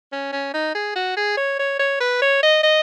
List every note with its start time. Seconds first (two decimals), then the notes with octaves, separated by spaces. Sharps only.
0.12 C#4
0.33 C#4
0.54 D#4
0.75 G#4
0.96 F#4
1.17 G#4
1.37 C#5
1.59 C#5
1.79 C#5
2.00 B4
2.22 C#5
2.43 D#5
2.64 D#5